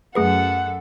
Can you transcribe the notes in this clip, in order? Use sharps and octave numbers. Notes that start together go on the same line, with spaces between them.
F#2 A3 G#4 A4 B4 F#5